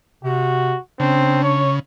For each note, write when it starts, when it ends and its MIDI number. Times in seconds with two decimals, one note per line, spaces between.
0.24 0.75 48
0.24 0.78 66
1.00 1.79 49
1.00 1.39 60
1.00 1.64 62
1.43 1.73 73